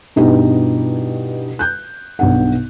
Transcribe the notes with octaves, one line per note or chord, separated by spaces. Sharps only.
G2 B2 D#4 E4 G4
F#6 G6
B1 G2 F#5